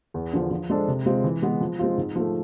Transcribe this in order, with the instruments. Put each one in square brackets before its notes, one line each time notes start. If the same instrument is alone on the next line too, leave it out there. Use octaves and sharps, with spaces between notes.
[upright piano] E2
D3 F3
F3
G#3 D4 A4 C5
C3
G#3 C4 F4
E3
G#3 B3
F3
G#3 C4 F4
G#2
F3 A3